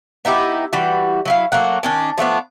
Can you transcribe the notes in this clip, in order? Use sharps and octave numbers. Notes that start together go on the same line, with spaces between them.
B3 D#4 E4 G4
E3 G3 F#4
F#3 E4 F5
F#3 A3 A#3 F#5
D#3 C#4 D4
F3 A3 B3 D4